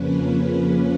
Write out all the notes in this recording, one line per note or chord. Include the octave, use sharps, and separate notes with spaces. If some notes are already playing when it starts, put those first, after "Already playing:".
Already playing: F2 C#3 F3 A#3 C#4 B4